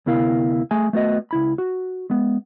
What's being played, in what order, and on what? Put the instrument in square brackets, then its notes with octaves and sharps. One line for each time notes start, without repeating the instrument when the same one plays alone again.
[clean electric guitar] D2 C3 B3 E4 A#4 F5
A3 G#4 G#5
A3 B3 F#4 D#5
C#2 E4 B5
F#4
G#3 B3